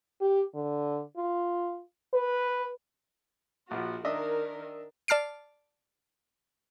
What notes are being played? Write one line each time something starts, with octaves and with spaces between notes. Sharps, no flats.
G4
D3
F4
B4
A#1 F3 F#4
D#3 D4 A#4 D#5 E5
D5 A5 F6 C7 D7